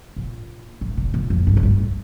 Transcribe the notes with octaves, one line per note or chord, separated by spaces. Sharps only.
A#2
A2
A#2
A#2
F2
G2
A2
G2